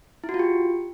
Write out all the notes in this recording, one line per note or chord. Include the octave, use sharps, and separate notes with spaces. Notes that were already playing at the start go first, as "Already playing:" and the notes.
E4
F#4
F4
G4